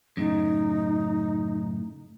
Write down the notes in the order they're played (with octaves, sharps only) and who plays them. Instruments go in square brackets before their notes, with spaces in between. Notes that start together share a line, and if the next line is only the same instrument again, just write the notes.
[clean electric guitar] F#2 A2 C#3 [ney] D#4